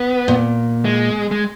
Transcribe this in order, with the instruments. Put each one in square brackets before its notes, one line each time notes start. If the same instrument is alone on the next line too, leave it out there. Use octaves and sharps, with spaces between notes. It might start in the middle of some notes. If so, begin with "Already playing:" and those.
Already playing: [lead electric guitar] B3
[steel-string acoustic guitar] A#2
[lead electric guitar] G#3
G#3